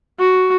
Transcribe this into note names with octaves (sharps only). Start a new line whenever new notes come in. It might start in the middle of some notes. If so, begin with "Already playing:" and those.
F#4